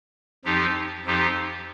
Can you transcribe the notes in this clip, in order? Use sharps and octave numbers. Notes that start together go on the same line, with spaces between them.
F2 F3 D#4 G4
F2 F3 D#4 G4